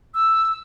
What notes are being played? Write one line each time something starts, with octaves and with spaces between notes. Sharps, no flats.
E6